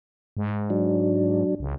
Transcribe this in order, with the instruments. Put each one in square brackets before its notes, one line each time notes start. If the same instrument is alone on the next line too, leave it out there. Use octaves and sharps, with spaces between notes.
[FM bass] G#2
[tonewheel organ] F#3 D4
[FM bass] C#2